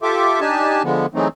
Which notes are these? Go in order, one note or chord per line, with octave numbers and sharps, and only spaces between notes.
F4 G4 A4 E5 D6
D4 D#4 G4 G#5 A5
D3 F3 G#3 B3
E3 F#3 G#3 A3 C4 D#4